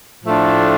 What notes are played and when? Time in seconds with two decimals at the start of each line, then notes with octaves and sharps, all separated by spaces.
0.24 A2 F3 A3 D4 F4